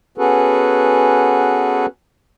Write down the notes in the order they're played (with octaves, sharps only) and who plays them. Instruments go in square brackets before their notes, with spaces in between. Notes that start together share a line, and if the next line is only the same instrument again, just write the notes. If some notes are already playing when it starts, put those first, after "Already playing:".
[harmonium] B3 C#4 F#4 G#4 A4 B4